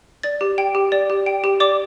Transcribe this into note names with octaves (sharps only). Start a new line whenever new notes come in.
D5 A6
G4
G5
G4
D5
G4
G5
G4
D5 D6